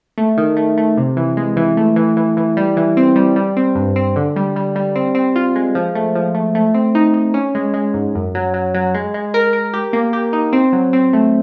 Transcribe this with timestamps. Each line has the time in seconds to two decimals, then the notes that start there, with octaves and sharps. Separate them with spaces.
0.18 A3
0.37 D#3
0.57 A3
0.77 A3
0.98 C3
1.17 E3
1.37 G#3
1.57 E3
1.77 A3
1.96 E3
2.17 E3
2.37 E3
2.57 G3
2.77 E3
2.97 C4
3.16 G3
3.36 G3
3.57 C4
3.75 G2
3.96 C4
4.16 D3
4.36 G3
4.56 G3
4.76 G3
4.95 C4
5.15 C4
5.36 F4
5.55 G#3
5.75 F3
5.95 A3
6.15 F3
6.35 A3
6.55 A3
6.74 C4
6.95 D#4
7.14 D#4
7.34 C#4
7.55 G#3
7.74 G#3
7.94 G#2
8.15 F#2
8.35 F#3
8.54 F#3
8.74 F#3
8.94 G#3
9.14 G#3
9.34 A#4
9.53 A#4
9.74 G4
9.93 A#3
10.13 G4
10.33 D#4
10.53 C4
10.73 F#3
10.93 C4
11.13 A3